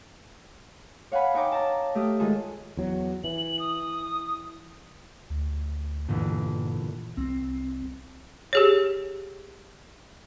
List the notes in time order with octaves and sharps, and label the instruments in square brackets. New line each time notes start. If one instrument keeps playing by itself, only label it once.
[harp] C#5 F5 F#5 G#5 B5
D#4 C#5 G5 A#5 D6
A5 A#5
A3 G4 D#6 F6
D#3 G#3 F4 G#4 A4
[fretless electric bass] E2 F#3
[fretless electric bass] E3 [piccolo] F#7
[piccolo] D#6
[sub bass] D2
[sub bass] G2 [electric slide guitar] A#2 D3 E3
[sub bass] C2 [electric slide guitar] C4
[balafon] G4 G#4 C#5